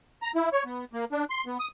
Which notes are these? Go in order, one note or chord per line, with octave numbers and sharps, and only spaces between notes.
A#5
E4
C#5
B3
A#3
D4
C6
B3
D#6